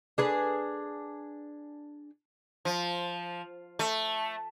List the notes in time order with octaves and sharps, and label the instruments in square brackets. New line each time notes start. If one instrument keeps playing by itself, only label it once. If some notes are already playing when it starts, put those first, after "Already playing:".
[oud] D4 G#4 B4
[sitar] F3
A3